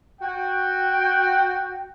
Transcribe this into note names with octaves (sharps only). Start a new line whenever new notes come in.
F#4 G5